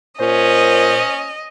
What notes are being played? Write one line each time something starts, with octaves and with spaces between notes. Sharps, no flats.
A#2 C#4 C5 D#5